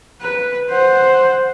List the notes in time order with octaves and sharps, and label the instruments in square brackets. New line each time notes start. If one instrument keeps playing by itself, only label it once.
[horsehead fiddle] B4
C5 F#5